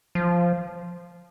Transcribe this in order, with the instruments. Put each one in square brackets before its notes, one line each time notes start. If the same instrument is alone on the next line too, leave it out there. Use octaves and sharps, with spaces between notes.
[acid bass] F3